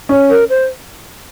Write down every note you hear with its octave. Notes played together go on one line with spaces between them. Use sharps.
C#4
A#4
C5